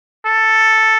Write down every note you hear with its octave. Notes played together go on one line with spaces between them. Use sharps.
A4